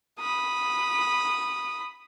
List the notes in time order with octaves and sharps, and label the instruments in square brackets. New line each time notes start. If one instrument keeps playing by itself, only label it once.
[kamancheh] B5 D#6